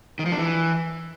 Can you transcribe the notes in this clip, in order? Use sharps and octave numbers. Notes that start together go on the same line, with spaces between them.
D#3
F3
D4
E3